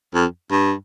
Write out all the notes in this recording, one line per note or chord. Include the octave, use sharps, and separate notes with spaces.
F2
G2